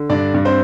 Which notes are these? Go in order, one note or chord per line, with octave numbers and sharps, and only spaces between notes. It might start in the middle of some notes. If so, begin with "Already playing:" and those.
Already playing: D3
G2 D4 D5
G2
C4 C5